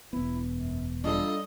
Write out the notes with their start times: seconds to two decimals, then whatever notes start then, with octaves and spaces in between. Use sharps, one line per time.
0.13 E1 B3 E4
0.50 F#2
1.04 G3 D4 F4 A4 D#5